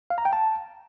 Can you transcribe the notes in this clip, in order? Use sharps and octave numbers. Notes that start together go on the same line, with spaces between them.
F5
A#5
G5
A5